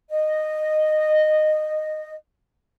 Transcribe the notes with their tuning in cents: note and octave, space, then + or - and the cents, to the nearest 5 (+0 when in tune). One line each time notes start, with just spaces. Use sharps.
D#5 -15